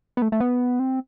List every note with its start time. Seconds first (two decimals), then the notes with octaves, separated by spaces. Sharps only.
0.17 B3
0.22 A3
0.32 A3
0.40 B3
0.79 C4